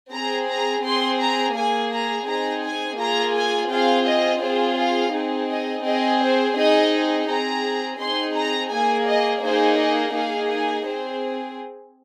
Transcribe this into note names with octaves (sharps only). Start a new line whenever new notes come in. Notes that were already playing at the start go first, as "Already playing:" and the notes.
C4 G#4 A#5
A#5
C4 G#4 C6
A#5
A#3 G#4 G#5
A#5
C4 D#4 G#4 A#5
G#5
A#3 F4 G#4 A#5
G#5
C4 F4 G#4 F5
D#5
C4 F4 G#4 C5
F5
C4 D#4 G#4
D#5
C4 G#4 D#5
C5
C4 D#4 G#4 D#5
C4 G#4 A#5
C4 D#4 G#4 C6
A#5
A#3 G#4 G#5
D#5
A#3 D#4 G#4 C5
D#5
A#3 D#4 G#4 F5
G#5
C4 G#4 C5